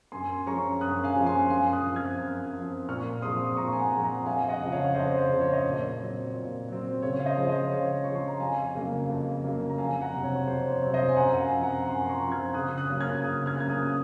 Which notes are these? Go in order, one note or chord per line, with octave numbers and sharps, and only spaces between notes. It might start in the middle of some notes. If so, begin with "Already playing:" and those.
F#2 G#5 C6
F3 G#3 C#4 A#5 C#6
F#2 D#6 F#6
F5 G#5
F3 G#3 C#4
G#5 C6
F#2 F5 G#5
D#6 F#6
F3 C4
F6 G#6
F#2
F3 C4
A#2 C#6 F6
F3 G#3 C4 C6 D#6
D#6
A#2 A#5 C#6
G#5
F#5 A#5
F3 G#3 C4
F#5 A#5
F2 F5 G#5
D#5 F#5
C#3 F3
C#5 F5
F2 C5 D#5
C5
C#3 F3
C#5
D#5
A#2 C#5
F#3 C4
A#2
F#3 C4
C#3 C#5
F5
C5 D#5
F3 G#3
C5 D#5
C#3 C#5 F5
F3 G#3 C#6
C6
A#5
F2 F5 G#5
C#3 F#3 A#3
F2
C#3 F#3 A#3
A#5
F2 F5 G#5
F#5 A#5
C3 F#3 C4
C#5
F2 C5
C#5
C3 F#3 C4
C5 D#5
G#5
F#2 F#5 A#5
F5 G#5
F3 C4
F#5 A#5
F#2 G#5 C6
C6
A#5 C#6
F3 C4
F6 G#6
C#3 D#6 F#6
D#6 F#6
F#3 A#3 C#4
F6 G#6
C#3 D#6 F#6
F6 G#6
F#3 A#3 C#4 G#6
D#6 F#6
D#6